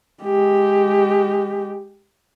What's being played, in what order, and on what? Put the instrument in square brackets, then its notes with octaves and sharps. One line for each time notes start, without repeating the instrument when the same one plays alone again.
[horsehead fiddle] G#3 G4